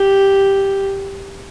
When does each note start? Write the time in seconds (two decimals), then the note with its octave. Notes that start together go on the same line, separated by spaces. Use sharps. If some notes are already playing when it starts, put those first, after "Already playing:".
Already playing: G4